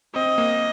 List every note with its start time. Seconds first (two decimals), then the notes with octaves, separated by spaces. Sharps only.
0.15 C4 D#5
0.38 A#3